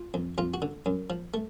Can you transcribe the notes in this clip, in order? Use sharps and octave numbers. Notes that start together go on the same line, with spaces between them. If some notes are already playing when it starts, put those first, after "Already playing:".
Already playing: F4
F2
F2 F4
F#4
D3
F#2
F3
A3